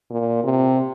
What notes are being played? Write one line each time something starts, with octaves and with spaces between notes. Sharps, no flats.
A#2
C3